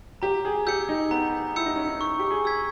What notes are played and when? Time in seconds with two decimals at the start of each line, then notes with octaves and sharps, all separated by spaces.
0.22 G4 A#5
0.45 G#4
0.67 G4 E6 G6 C#7
0.89 D#4
1.11 B3 A#5
1.56 E4 E6 G6 C#7
1.66 D#4
1.76 C#4
1.86 D#4
2.01 C#6
2.19 G4
2.31 G#4
2.45 E6 G#6 B6